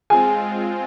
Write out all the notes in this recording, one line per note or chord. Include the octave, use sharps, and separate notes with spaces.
G#3 C4 F4 G#4 G#5